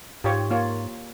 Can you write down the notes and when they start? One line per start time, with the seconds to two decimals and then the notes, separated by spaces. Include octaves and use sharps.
0.24 G#2 F4 G4 C#5
0.51 A#3 F4 C#5